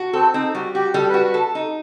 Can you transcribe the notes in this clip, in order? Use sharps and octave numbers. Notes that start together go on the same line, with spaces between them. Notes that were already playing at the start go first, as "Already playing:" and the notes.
Already playing: F#4
C4 A4
C4 D#4
G3 F#4
F#4 G4
G3 A4
F#4 B4
B4
A4
D#4